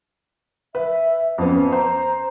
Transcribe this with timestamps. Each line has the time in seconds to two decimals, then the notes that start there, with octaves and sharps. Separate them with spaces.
0.75 B4 E5
1.38 F2 B3 C#4
1.73 C5 A#5